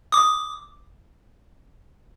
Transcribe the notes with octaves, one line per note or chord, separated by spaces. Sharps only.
D6 D#6